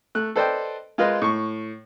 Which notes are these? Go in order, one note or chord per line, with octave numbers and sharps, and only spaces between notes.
A3 F#6
A4 B4 C5 D5 D#5 G5
G#3 F4 A#4 B4 D#5
A2 C#6